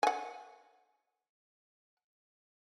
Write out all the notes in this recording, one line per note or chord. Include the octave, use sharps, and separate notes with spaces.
F#5 G#5